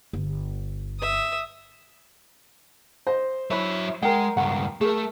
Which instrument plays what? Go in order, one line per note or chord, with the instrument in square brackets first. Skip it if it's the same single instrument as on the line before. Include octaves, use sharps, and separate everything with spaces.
[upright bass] G1
[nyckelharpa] E5 D#6
[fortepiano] C5 [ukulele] D#5
[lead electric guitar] F#3 E5 [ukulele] E4 B4 C#5
[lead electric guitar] G#3 [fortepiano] A#4 G5 [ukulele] F#5
[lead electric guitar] C#2 G2 [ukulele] F#5
[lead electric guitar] A3 [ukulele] G#4 A#4